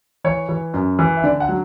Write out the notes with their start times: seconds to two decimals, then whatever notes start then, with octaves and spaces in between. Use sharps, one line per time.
0.24 E3 C#5
0.49 E3
0.74 F#2
0.99 E3
1.17 E5
1.24 D3 D5
1.40 F#5
1.48 F#3